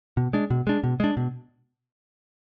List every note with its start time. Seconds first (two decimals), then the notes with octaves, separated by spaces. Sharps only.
0.17 B2
0.33 G#3 D4
0.50 B2
0.67 G#3 D4
0.84 B2
1.00 G#3 D4
1.17 B2